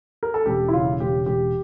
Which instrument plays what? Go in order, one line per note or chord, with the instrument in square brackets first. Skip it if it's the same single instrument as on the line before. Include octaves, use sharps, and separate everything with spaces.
[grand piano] A#4
A4
E1 G4
E4
C#3 F4
E1 G4
E1 G4